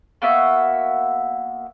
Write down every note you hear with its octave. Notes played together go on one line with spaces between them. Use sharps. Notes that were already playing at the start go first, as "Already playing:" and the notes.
A#3 B3 F#4 E5